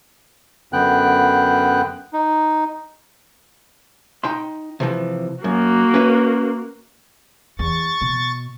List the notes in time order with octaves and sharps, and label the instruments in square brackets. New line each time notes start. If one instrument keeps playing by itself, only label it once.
[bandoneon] F#2 D3 B3 G5 F#6
D#4
[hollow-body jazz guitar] D#4 G5 C6
C3 E3 F3
[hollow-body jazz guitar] F#2 [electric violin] A#3 F#4
[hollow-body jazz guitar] C#4 B4 E5
[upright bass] E2 [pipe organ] C#6 A6
[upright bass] B2